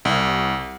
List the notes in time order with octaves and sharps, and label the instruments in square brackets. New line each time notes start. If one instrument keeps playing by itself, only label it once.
[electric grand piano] C2